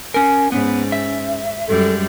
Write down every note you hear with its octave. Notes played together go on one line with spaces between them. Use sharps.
C#4 A#4 G#5
G#2 B3 C#4
E5
F#2 G3 G#3 A4